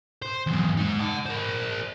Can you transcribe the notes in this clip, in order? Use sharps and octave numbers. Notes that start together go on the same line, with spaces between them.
C5
E2 F#3
G#3 D#4
F#5 A5
A#4 C5